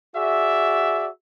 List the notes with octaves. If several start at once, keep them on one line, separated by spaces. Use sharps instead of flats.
F#4 G#4 D5 E5